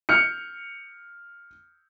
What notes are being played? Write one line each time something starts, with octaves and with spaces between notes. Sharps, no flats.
F6 G6 C#7